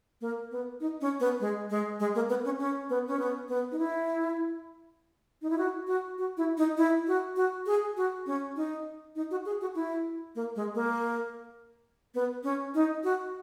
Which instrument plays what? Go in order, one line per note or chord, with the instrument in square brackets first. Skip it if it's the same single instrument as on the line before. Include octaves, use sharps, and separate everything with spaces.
[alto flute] A#3
B3
D#4
C#4
B3
G#3
G#3
G#3
A#3
B3
C#4
C#4
B3
C#4
B3
B3
D#4
E4
D#4
E4
F#4
F#4
F#4
E4
D#4
E4
F#4
F#4
G#4
F#4
C#4
D#4
D#4
F#4
G#4
F#4
E4
A#3
G#3
A#3
B3
C#4
D#4
F#4